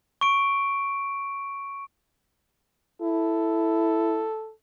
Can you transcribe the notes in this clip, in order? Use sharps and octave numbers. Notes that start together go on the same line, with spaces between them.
C#6 D7
E4 A4